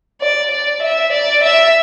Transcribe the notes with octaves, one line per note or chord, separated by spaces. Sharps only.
D5
D5
E5
D5
E5